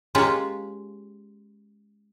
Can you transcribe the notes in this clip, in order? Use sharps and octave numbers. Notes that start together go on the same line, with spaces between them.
G#3 A#3 C#4 F4 G4